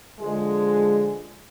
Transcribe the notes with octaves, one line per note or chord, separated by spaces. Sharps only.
D3 F3 G#3